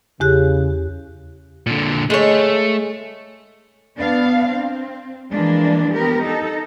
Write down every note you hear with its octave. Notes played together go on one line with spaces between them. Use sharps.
E2 C#3 G4 F#6
A#2 D3
G#3 A3 C#5
B3 D4 F5
C4
E3 F3 G#3 A#3 D4
B3 G4 A#4
D#4 A4